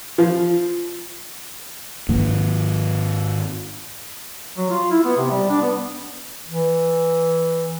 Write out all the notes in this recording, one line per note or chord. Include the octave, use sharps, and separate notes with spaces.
F3
G#2 D#3 A#3
F#3
F4
E4
B3
C3
G3
D4
B3
E3